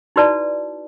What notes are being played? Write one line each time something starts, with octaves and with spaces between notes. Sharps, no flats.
D#4 E4 F#4 B4 D5 A5